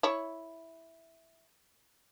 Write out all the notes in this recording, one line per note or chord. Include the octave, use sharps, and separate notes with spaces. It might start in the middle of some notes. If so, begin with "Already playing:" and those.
E4 C#5